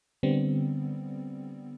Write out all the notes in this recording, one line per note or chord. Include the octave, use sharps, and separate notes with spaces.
D3 G3 B3 C4